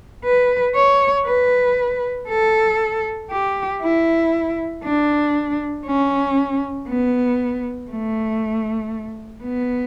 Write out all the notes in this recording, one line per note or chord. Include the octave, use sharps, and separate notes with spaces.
B4
C#5
B4
A4
G4
E4
D4
C#4
B3
A3
B3